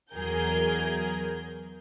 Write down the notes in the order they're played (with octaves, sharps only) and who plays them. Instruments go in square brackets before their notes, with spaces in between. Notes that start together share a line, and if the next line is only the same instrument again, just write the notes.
[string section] E2 F#3 G#4 A#4 G6